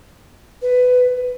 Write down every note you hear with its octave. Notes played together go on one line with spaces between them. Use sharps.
B4